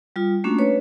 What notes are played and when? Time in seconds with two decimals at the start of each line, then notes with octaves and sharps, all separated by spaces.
0.16 G3 F4
0.44 A3 A#3 C#4 D4 F#4
0.58 B4 C#5